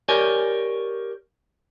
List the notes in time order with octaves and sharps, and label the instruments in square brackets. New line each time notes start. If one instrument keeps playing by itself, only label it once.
[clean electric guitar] G4 A#4 C#5 D5 G#5